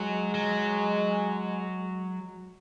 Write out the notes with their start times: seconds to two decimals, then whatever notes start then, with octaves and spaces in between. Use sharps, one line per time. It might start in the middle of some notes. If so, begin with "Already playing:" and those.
Already playing: F#3 G#3
0.35 F#3